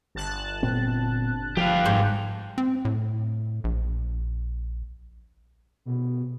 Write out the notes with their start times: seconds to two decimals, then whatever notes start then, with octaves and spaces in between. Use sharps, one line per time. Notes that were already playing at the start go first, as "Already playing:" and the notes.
0.15 G1 A5 F#6
0.63 A#2 B3 C4
1.57 F3 G4 F5
1.86 G#2
2.58 C4
2.85 A2
3.64 A#1
5.86 B2